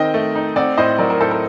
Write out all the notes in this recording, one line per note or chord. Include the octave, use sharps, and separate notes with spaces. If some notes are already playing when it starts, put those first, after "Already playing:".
Already playing: D#3 C4 D#5 G5
A3
D#4
C4 D5 F#5
A2 C5 D#5
F#3 A#4 D5
A#4
A2 A4 C5
A#4